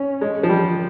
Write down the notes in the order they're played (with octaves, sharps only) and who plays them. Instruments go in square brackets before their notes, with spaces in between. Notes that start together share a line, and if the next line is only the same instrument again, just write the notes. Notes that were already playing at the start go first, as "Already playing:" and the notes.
Already playing: [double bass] C#4
[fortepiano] G#3
F3
G3